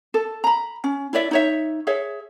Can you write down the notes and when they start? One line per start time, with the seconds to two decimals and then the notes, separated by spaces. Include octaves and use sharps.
0.14 A4
0.44 A#5 B5
0.84 C#4
1.13 E4 C#5 D5 E5
1.31 D#4 C#5 E5
1.87 G#4 C#5 E5